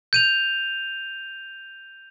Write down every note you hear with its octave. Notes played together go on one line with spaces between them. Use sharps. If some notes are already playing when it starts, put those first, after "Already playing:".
G6 D#7 F7